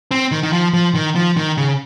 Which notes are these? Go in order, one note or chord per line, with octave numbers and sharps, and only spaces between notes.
C4
D#3
D#3
F3
F3
D#3
F3
D#3
C#3